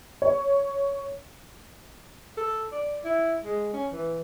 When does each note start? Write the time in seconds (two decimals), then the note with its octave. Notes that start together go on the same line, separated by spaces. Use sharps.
0.22 C#5
2.38 A4
2.72 D5
3.05 E4
3.45 G#3
3.74 C#4
3.93 E3